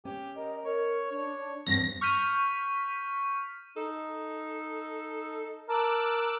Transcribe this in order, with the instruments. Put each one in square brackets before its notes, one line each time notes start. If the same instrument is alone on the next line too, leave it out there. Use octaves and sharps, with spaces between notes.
[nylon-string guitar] C#4 [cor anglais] G4
[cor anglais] A#4 [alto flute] D#5
[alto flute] A#4 [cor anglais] C#5
[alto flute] D4 [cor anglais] C#5
[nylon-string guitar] E2 G2 [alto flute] C4 [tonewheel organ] A#6
[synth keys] C#6 F6 G6 B6 D#7
[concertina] D#4 [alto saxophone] A4
[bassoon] A#4 [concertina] A5 [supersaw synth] D6 E6 F#6